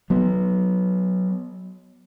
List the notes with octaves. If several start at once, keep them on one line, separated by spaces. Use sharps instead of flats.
F#3 B3